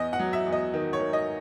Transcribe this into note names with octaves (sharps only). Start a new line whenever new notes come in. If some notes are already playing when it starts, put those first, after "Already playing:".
Already playing: E2 D#5
F#5
F#3
E5
E2
D#5
D#3
C#5
D#3
D#5